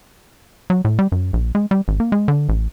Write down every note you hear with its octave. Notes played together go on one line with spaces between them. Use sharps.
F#3
A2
G3
F#2
A#1
G#3
G3
G#1
A#3
G#3
D3
A1